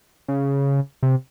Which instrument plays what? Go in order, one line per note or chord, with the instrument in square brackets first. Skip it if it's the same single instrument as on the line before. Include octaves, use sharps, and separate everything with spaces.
[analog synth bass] C#3
C3